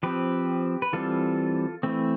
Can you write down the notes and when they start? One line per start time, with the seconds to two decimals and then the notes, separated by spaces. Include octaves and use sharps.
0.03 F3 C4 G4 B4
0.82 B4
0.93 E3 G3 C4 F4 A4
1.83 E3 A3 C4